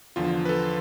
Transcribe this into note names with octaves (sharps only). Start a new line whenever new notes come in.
E2 D3 F3 F4
B4
A4